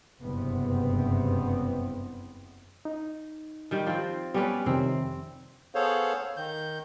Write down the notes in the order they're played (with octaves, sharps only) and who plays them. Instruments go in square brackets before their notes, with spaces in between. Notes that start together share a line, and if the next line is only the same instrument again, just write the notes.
[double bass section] F#1 E2 G2 C3 B3 C4
[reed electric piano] D#4
[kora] D#3 G3
F3 C4
[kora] G3 C#4 B4 [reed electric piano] B3 D5
[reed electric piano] F2 C3 D#3 [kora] C4
[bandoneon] B3 G#4 A4 C5 C#5 F5
D#3 G6